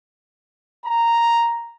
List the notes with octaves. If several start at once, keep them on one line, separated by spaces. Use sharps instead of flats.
A#5